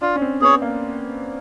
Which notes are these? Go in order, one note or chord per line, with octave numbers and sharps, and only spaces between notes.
D4 F4
C#4
C4
B3 G#4 C#5
A#3